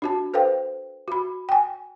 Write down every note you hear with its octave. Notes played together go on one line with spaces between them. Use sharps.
D4 F#4 A5
A4 B4 C5 F5 G5
F#4 B5
G5 G#5